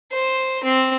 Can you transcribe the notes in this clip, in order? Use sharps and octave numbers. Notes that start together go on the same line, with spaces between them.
C5
C4